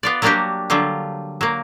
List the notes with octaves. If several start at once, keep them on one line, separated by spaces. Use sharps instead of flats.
B3 F4 D5
F#3 G3 A#3 D4 F#4 G4
D3 F#3 G3 F4
F#3 A#3